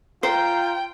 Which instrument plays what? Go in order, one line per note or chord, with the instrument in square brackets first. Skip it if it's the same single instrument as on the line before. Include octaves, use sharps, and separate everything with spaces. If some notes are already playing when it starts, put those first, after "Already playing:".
[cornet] F4 [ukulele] C5 [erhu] G5 [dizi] A#5